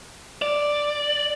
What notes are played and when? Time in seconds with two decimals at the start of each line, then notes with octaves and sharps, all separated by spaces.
0.42 D5